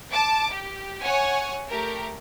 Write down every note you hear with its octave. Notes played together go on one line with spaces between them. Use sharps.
A5 D6
G4
C#5 F#5 G#5
A3 G4 A#4